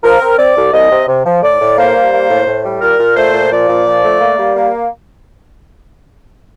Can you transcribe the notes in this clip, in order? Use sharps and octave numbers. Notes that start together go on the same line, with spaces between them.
F3 A#4
C4
C4 D5
C2
C2 D#5
C3
C3
F3
A2 D5
A2
A#3 C5
G3
A#3
A2
A2
G3
A#2 A#4
A#2
A3 C5
A#2
F3 D5
A#2
F3
A3
A#3
G3
A#3